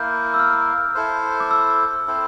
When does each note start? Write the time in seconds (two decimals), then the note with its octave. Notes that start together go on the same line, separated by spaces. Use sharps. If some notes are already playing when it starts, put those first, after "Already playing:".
Already playing: A#3 E4 A#4 G6
0.34 E6
0.40 F6
0.95 E4 A4 C5
1.40 D6
1.51 E6
2.07 C4 E4 A4 C5